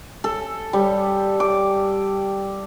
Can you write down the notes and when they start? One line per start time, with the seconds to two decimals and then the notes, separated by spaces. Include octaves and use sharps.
0.24 A4
0.73 G3
1.40 D6